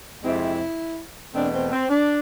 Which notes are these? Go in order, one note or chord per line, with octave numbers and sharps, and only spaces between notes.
F2 C3 G#3 C4 E4
E2 B2 A3 C4 D4
C4
C4
D4